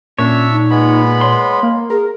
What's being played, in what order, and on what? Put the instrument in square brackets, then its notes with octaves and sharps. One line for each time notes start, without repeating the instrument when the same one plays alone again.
[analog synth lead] A#2 [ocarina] C#4 [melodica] D4 E5 E6 [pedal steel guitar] C#5
[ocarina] D#4
[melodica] G#3 B3 B5
[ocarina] C#5 [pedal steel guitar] C6
[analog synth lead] A#3
[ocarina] G#4 [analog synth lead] A#4